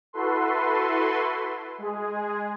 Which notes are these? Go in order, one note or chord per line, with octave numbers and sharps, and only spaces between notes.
E4 F#4 A4 B4 C6
G#3 G#4